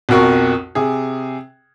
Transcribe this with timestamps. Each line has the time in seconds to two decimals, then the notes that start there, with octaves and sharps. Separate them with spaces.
0.09 B1 F2 F#4 A#4 C#6
0.75 C3 G#4